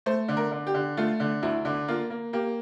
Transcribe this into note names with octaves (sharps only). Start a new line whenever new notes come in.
A3 C5
D3
A#4
D3
G4
D3
A3 F4
D3
D2 E4
D3
A#3 F4
A#3
A#3 G4